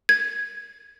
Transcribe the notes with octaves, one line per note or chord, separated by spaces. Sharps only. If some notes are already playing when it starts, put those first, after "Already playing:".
G#6